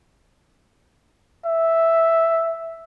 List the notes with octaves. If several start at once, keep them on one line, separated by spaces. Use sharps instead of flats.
E5